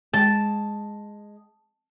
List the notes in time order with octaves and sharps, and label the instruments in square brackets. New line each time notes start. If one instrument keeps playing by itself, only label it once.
[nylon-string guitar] G#3 G5 [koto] A5